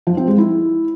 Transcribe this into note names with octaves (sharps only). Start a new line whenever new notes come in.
F3
C4
G#3
E4